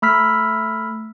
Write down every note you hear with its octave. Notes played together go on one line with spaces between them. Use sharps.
A3 B5 E6 F6 B6